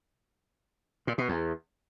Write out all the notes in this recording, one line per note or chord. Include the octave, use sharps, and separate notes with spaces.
A#2
B2
E2